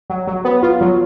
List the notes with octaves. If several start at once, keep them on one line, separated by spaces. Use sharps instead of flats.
F#3
F#3
B3
F4
F#3